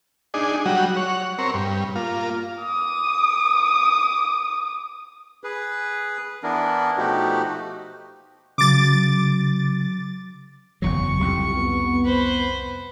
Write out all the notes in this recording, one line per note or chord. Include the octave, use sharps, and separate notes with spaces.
D4 D#4 G#4
F#3 G3 F#4
C#5 F#5
C4 A#4 C#5
G2
A#3 F4
D6 D#6
G#4 B4
E3 B3 D4 E4 A#4
B2 F3 A3 D#4 F#4 G4
C#3 F#3 D6 A6
F#1 E2 F#3 C#6
C2 F2 G4
B3
B4 C5